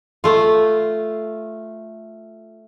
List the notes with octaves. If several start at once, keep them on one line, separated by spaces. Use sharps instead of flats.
A3 F4